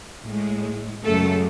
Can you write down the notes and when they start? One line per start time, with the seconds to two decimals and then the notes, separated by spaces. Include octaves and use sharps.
0.24 A2 G#3
1.04 F#2 C#3 G#3 A3 A4